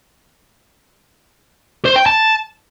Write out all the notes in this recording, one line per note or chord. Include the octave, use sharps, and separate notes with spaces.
C5
G5
A5